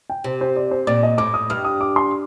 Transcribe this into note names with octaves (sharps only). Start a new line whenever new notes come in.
G5
C3 C5
C5
D5
C5
A#2 D5
D#5
A2 D6
D#6
G2 F6
D#6
D6
C6